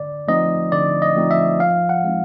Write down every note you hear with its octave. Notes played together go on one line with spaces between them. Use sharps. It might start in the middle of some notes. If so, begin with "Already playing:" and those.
Already playing: D3 D5
F3 A3 C4 D#4 D#5
D3 D5
D#5
F3 A3 C4 D#4
E5
F3 F5
F#5
G#3 C4 D#4